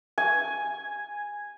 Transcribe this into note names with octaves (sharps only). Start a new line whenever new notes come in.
G#5